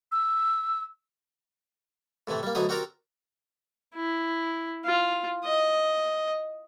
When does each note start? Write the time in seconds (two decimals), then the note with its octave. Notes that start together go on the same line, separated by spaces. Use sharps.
0.12 E6
2.27 A2 C3 E3 A3
2.43 G3 A#3
2.55 D2 D3 F#3 B3 D#4 D#6
2.69 C4 F#4 G4 A#4 D5 A#5
3.95 E4
4.85 F4
5.44 D#5